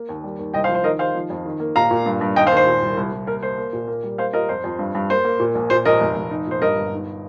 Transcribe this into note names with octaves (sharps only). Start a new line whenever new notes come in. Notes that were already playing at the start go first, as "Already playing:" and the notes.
Already playing: A#3
D#2
G3
D#2
C2 D#5 G5
C5 F5
F3
C5
D#3 A#4 D#5
D#3 C5 F5
F3
F2
D#3
A#3
A#2 F5 A#5
A#2
G2
G2
D#2 D#5 G5
C5 F5
D#2
C5
A#2
C2
C2
C2
A#3 A#4
A#3 C5
A#3
A#2
A#3
G3
A#3 C5 F5
F4 A#4 D#5
F2 C5
F2
G2
G2
A#3 C5
A#3
A#2
A#1
A#2 C5
A#1 A#4 D#5
F1
F1
D#4
A#2 C5
G2 A#4 D#5
G1
D#4